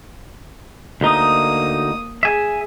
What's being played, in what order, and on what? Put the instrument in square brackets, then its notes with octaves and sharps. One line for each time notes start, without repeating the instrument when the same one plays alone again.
[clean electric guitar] D2 D#4 [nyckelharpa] A#3 D#6
[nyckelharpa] G#4 [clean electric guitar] E5 G#5